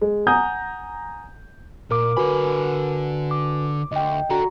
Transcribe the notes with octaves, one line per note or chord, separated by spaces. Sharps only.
G#3
F#5 G#5 A#5 D#6 G6
A#2 A#4 D6
D3 F#4 B4 G#5 B5
D6
D2 D#5 G5
F#4 A4 D5 A#5